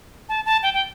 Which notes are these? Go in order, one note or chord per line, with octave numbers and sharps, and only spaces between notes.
A5
A5
G5
G5